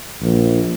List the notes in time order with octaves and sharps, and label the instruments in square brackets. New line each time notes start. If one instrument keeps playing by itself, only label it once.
[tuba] A#1